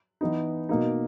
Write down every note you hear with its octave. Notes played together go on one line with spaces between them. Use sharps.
E3 B3 D#4
B2 A#3 D#4